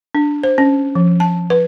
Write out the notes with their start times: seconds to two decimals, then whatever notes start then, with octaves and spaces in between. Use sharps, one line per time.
0.15 D4
0.43 C5
0.58 C#4
0.95 F3
1.20 A5
1.50 B4